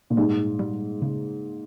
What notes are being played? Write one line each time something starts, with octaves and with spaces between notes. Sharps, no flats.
A#2
G#2 G3
G3
C#3